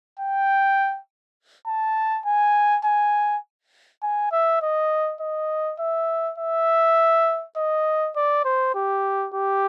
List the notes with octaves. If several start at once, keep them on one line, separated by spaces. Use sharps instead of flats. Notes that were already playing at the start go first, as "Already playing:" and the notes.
G5
A5
G#5
G#5
G#5
E5
D#5
D#5
E5
E5
D#5
D5
C5
G4
G4